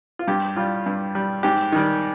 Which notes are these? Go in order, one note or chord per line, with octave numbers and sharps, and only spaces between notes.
F4
G2 G4
G3 F4
G2
G3
G#2 G4
D#3 G3